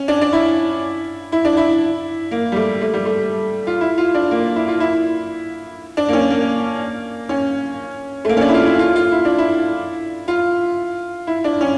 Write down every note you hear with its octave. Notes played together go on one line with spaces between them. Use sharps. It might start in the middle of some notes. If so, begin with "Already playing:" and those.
Already playing: C#4
D4
D4
E4
E4
D4
E4
A#3
G3
A3
A3
G3
A3
F4
E4
F4
D4
A#3
E4
F4
E4
D4
A#3
C#4
A#3
C#4
A3
A#3
C#4
D4
E4
F4
E4
F4
F4
E4
D4
E4
F4
E4
D4
C#4